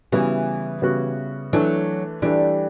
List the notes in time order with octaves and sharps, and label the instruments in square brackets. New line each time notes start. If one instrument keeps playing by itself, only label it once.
[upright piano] C#3 G3 B3 F#4 [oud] E3
[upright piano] C#3 G3 B3 F#4
[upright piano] E3 A3 D4 [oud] F#3
[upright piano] E3 A3 D4 [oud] G3